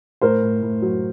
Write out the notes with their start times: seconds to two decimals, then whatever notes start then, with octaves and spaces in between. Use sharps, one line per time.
0.22 A2 A#4 C5
0.43 A2
0.62 A2
0.82 F#3